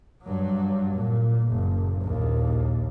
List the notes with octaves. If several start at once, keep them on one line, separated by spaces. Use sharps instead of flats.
G2 F#3
A#2
F#1
A#1 D#2